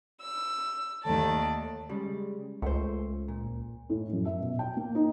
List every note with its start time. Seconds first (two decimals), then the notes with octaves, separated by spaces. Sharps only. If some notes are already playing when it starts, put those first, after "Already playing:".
0.21 E6
1.04 D#2 D#3 A3 D5 A5
1.89 C#3 G3 G#3
2.62 C#2 A3 C5
3.28 A#2
3.90 A2
4.12 F#2
4.25 E5
4.40 B2
4.59 G5
4.77 A#3
4.95 D#4